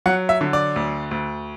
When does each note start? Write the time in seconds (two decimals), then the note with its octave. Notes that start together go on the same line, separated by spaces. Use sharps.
0.06 F#3 F#5
0.29 E5
0.41 D3
0.53 D5
0.76 D2
1.11 D2